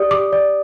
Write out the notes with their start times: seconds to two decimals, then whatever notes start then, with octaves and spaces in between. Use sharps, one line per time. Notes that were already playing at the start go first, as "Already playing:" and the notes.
Already playing: G4 D5 D#6
0.11 G4 D6
0.33 D5